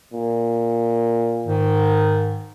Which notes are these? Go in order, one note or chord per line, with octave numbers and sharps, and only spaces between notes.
A#2
G#2 D#3